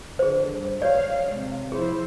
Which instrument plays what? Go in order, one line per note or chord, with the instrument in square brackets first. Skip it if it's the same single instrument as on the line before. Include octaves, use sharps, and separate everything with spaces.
[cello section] D3 [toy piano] G#4 C5
[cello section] G2
[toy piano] G4 C#5 D5 [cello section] F5
[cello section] C3 G#3
[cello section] F3 E4 C5 [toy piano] G#4